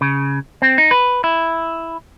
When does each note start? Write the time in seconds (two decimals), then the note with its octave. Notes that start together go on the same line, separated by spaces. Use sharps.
0.01 C#3
0.62 C4
0.78 D#4
0.91 B4
1.24 E4